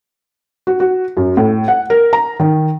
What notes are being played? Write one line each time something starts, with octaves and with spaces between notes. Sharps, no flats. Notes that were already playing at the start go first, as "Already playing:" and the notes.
F#4
F#4
F#2
A2
F#5
A#4
A#5
D#3